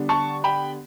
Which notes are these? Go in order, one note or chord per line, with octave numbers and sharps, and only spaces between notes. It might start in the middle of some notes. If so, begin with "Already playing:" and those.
Already playing: D3 G3 B3 D4
A5 C#6
G5 B5